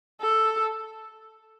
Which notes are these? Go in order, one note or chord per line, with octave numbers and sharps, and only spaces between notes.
A4